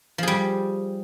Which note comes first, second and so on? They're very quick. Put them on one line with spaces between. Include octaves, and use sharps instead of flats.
F3 G#4 G3